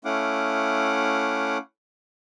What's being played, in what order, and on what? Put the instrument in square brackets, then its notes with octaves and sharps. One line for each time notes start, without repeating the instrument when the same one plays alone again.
[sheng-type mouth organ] A3 C#4 E4 F5 F#5 D6